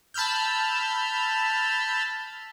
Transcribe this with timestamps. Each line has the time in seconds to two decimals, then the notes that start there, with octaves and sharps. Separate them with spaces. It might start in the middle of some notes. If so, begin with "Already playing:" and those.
0.14 A5 B5 E6 F6 G6